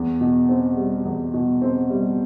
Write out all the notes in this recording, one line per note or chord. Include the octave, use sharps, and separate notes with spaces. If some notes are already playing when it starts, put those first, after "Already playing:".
Already playing: E2
B2
C4
G3
E2
B2
C4
G3